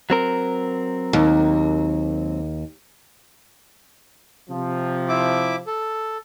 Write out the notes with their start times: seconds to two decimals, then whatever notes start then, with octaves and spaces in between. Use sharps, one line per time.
0.10 F#3 C4 A#4
1.13 D#2
4.50 C3 F3
5.09 E4 E5 D6
5.67 A4